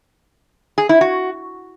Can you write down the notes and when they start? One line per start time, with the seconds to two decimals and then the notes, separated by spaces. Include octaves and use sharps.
0.78 G#4
0.89 E4
1.01 F#4